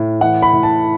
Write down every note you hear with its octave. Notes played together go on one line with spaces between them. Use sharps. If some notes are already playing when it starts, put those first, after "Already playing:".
Already playing: A2
E3 F#5
B5
A2
A5